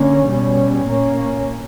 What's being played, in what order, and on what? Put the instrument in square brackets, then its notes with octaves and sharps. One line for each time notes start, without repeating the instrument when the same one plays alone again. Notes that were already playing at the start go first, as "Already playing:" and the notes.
Already playing: [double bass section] D3 A#3 C#4
B2 G3 C#4
A#2 A#3 C#4